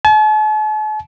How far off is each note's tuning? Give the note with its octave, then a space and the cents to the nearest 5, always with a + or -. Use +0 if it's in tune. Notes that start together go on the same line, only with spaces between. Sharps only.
A5 -45